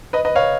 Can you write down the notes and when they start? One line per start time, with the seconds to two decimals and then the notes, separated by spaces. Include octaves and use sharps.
0.13 B4 D#5
0.25 B4 D#5
0.36 C#5 F5